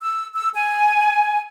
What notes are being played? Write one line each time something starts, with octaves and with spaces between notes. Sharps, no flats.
E6
E6
G#5